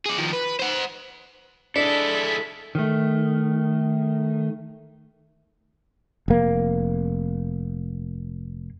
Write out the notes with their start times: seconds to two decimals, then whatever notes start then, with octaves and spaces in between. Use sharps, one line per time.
0.05 G#4 D5
0.18 D#3 F3
0.33 B4
0.59 C5 F#5
1.76 G#3 D4 E4 A4 B6
2.75 D#3 A3
6.28 F1 A#3